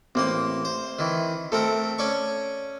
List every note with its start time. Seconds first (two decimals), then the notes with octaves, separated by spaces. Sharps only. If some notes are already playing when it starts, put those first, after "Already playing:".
0.15 A1 A#3 C4 C6
0.65 C5
0.99 D#3 E3
1.52 A3 C4 A4 A#4
1.98 C#4 D5 C#6